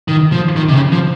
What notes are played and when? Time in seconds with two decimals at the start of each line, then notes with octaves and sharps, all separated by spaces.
0.08 D#3
0.32 F3
0.56 D#3
0.69 C3
0.75 C#3
0.92 F3